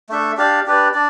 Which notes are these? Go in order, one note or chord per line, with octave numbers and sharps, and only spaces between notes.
A3 D4 A4 E5
D4 G4 D5 F5
D4 G4 B4 D5
D4 D5